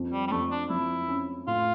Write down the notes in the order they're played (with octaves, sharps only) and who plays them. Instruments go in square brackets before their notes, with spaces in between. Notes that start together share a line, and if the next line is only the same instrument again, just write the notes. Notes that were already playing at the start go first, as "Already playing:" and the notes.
Already playing: [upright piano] F2
[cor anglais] G3
G3
[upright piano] F2 [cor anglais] A3
[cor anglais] D4
[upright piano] F2 [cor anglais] E4
[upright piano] C#4
[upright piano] A2 [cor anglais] F4